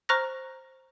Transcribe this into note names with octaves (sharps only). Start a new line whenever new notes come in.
C5 A#5 C#6 F6 F#6 A#6